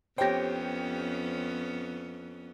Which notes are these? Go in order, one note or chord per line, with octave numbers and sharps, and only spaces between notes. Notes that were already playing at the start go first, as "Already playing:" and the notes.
F2 B3 C#4 G4 C5 C#5 G5 A#6